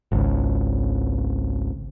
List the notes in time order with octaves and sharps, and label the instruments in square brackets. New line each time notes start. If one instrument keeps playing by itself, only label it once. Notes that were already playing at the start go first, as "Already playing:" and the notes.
[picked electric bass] G#1 C#2